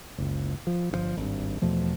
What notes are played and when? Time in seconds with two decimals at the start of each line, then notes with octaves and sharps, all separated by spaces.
0.18 F#1 C#2
0.67 F3
0.91 G1 C#3 F3
1.17 G#1 G2
1.62 E2 B2 F3 A3